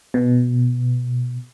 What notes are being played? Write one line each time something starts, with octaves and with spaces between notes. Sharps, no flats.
B2